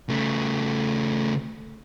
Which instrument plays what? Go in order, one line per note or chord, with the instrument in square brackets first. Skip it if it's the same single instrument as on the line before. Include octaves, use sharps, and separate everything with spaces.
[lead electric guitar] C#3 A3